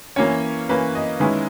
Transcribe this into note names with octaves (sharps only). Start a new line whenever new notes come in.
E3 A#3 C#4 C#5
E3 A#3 C#4 B4
D#5
D#3 G#3 C#4 E4 B4